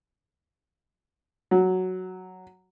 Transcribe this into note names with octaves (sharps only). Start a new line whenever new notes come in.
F#3